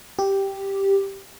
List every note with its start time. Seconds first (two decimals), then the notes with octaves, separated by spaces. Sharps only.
0.19 G4